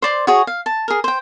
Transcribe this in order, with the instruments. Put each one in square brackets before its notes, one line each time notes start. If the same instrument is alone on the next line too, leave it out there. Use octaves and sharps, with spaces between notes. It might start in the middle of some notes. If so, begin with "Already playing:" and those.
[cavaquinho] C5 D5 C6
F#4 G#4 C#5
F5
A5
G#4 A#4
C5 G5